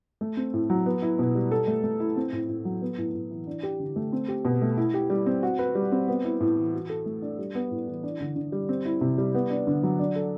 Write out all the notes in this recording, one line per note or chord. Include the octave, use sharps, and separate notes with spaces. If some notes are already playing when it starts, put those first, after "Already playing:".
A3
C4
A2
F#3
B3
E4
B2
G3
A4
A3
A3
E4
C4
A2
A2
F#3
B3
A2
A2
E3
D4
G4
D3
A3
C4
G4
B2
A3
E4
G4
G3
C4
F#4
B4
G3
C4
B3
E4
A2
E3
F#4
A4
A3
D4
G3
B3
A2
E3
D4
D3
D3
G3
C4
E4
C3
G3
B3
D4
D3
F#3
D4
A4